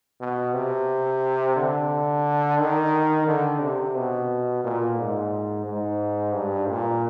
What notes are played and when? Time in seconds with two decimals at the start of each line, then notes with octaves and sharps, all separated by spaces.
0.20 B2
0.54 C3
1.56 D3
2.59 D#3
3.27 D3
3.61 C3
3.96 B2
4.64 A#2
4.97 G#2
5.66 G#2
6.34 G2
6.69 A#2